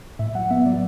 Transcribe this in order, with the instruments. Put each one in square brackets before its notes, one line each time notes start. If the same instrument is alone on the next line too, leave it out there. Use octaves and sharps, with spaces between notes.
[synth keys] A2 E5
F#3 F#5
B3 E5
F#3 D5